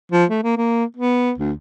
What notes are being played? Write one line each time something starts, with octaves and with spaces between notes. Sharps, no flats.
F3
A3
A#3
A#3
B3
D2